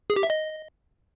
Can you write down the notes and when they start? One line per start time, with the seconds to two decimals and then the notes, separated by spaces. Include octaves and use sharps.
0.10 G#4
0.16 G4
0.23 E5
0.30 D#5